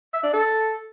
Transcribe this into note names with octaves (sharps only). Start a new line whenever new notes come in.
E5
D4
A4